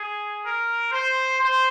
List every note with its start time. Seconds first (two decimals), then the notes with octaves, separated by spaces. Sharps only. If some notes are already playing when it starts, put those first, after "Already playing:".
Already playing: G#4
0.44 A#4
0.92 C5
1.39 C5